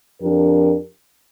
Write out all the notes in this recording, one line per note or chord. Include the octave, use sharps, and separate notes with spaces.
F2 F3 D4 G4 A#4